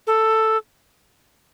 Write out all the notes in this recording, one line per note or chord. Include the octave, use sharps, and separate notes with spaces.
A4